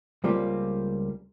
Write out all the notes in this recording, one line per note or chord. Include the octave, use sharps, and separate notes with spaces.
C#2 G3 A#3 C4 F4